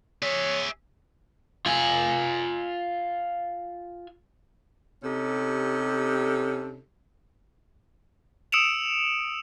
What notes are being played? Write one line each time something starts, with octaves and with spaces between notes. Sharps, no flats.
G#4 C#5 E5
F4 G#5
C3 C#4 D#4 G4 A4
D#6 E6 C#7 D7 E7 F7